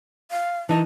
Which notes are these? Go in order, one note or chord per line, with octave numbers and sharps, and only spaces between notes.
F5
E3 D#4 A5